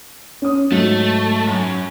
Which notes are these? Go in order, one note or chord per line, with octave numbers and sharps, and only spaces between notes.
C#4 D#6
G#2 F#3 A3
F#2